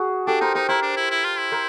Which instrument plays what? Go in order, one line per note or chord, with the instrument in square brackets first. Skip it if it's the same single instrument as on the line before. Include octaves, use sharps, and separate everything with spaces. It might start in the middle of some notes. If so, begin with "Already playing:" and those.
Already playing: [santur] F#4 G#4
[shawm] D4 [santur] G4 A4
[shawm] D#4 [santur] A#4 C5
[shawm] D#4 [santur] A#4 C5
[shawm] E4 [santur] A#4 C5
[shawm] D4
E4
E4
F4
E4
[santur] A#4 C5